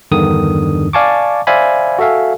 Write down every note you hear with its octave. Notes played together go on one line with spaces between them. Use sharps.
E2 G2 D3 D#3 D#6
D5 F5 G#5 A5 C#6 D6
C5 D5 E5 F5 G#5 B5
F#4 A4 E5 F5 G#5